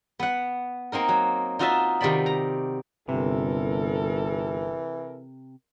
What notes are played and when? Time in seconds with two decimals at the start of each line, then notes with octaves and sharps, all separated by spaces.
0.19 B3 F#5
0.92 A#3 C4 D#4 A#4
1.08 F#3
1.59 D#4 F4 F#4 D#5 E5 A5
2.01 C3 D#3 B3 D5 B5
2.26 A#5
3.09 G1 C3 E3 A4 A#4